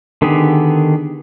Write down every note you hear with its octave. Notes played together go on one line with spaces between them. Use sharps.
D3 D#3 B3 G4 G#4